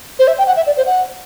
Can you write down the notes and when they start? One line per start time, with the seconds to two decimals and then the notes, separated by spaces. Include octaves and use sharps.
0.19 C5
0.28 E5
0.38 G5
0.47 F#5
0.57 E5
0.67 D5
0.77 C5
0.87 F#5